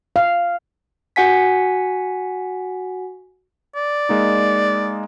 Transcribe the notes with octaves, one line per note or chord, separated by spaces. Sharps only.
F5
F#4 F#5 G#5 B6
D5
G#3 A#3 D#4